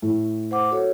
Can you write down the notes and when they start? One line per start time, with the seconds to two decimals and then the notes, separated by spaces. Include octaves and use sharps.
0.02 A2
0.51 C5 F#5 D6
0.71 F#4 A4 C#5